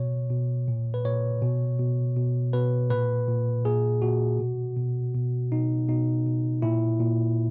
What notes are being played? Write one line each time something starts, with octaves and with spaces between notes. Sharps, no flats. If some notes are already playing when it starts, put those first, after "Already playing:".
Already playing: B2 C#5
B2
A#2
B4
A#2 C#5
B2
B2
B2
B2 B4
A#2 B4
A#2
A#2 G#4
A#2 F#4
B2
B2
B2
B2 D#4
B2 D#4
B2
A#2 E4
A#2